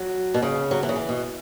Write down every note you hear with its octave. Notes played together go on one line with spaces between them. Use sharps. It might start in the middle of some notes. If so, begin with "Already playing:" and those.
Already playing: F#3
B2
C#3
F#3
E3
C#3
E3
B2